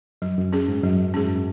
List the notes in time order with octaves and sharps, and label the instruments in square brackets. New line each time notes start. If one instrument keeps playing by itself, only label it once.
[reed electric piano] F#2 [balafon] F#3
[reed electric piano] F#2
[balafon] C#4 G#4
[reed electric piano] G#2
[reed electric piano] F#2 [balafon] F#3
[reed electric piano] G#2 [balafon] C#4 G#4
[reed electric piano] F#2